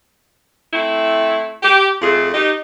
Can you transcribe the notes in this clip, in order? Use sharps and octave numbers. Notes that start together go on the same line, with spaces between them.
A3 C4 E4
G4
F2 A3 F4 G#4
D#4 G4